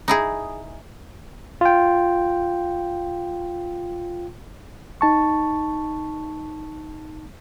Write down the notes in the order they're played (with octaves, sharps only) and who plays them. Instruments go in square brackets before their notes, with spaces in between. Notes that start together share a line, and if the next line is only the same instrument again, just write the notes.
[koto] D#4 E4 G#4
[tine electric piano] F4 G5
[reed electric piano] D#4 A5 C#6